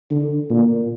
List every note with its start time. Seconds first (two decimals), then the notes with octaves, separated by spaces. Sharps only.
0.11 D3
0.50 A#2